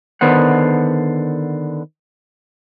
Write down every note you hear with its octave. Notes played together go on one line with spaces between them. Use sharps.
D3 D#3 B3 C5 F#5